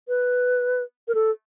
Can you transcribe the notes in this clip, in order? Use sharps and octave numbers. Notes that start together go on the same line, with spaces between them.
B4
A#4
A4